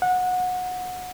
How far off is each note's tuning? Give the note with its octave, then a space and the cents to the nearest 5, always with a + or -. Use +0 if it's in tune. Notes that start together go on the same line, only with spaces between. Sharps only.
F#5 -20